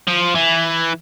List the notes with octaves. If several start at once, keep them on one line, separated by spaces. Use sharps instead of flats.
F3
E3